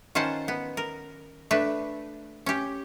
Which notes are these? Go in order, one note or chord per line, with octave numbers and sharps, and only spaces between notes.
D#3 C#4 F4 C5 F#5 A5
B3
A#4
A3 D4 B4
C#4 G4